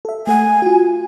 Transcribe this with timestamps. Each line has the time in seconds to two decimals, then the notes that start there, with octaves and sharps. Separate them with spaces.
0.05 A4 E5
0.27 A3 A4 F#5 G#5
0.62 F4 F#4